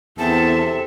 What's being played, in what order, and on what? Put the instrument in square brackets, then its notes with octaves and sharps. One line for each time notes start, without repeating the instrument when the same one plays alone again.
[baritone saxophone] E2 [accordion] C3 C4 [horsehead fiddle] A4 E5 [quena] A5